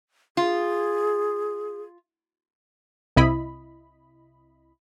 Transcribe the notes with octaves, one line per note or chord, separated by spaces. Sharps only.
F4 G#4
C2 C3 E4 D#5 B5